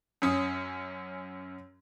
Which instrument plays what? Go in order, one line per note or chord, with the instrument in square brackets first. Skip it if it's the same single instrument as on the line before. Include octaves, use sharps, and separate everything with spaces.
[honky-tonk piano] F#2 C#4 D#6